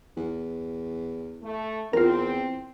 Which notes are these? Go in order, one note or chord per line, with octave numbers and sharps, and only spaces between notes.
E2
A3
E2 C4 F4 A#4